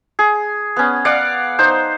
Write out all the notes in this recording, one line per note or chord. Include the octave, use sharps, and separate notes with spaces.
G#4
B3 C#4
D5 F5 F#5
D#4 C5